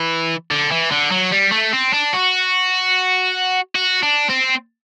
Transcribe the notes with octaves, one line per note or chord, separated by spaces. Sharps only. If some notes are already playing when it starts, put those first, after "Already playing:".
Already playing: E3
D3
E3
D3
F#3
G3
A3
C4
D4
F#4
F#4
D4
C4